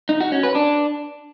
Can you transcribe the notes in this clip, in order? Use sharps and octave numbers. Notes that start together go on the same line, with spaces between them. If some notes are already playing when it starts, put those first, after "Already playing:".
D#4
F#4
C#4
B4
D4